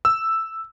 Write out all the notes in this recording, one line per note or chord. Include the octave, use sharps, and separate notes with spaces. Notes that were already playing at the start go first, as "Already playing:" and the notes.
E6